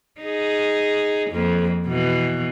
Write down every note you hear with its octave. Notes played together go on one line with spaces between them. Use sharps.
D#4 G#4
F2 A#3
B2 E3